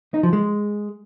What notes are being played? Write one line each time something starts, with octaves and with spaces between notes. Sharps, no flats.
D#4
F3
G#3